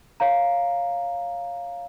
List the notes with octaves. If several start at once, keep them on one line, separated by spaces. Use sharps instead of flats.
C#5 F5 A#5